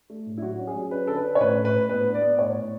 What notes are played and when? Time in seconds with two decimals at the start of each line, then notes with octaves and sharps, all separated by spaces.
0.10 A3
0.26 A2
0.38 E4
0.42 F#3 F#4
0.59 C#4
0.67 G#4
0.75 F#3
0.91 C#4 B4
1.07 D3 A4
1.16 B4
1.24 C#4
1.35 C#5
1.40 A2 B4
1.56 A2
1.65 B4
1.73 A2
1.89 B3 B4
2.06 D4
2.14 D5
2.22 B3
2.38 A2 C#5
2.55 A2